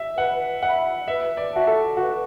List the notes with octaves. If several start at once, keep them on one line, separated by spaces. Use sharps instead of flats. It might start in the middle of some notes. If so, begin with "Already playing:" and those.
Already playing: E5
B4 F#5
E5 F#5 B5
B4 E5
D5
F#4 E5 A5
A4
F#4 B4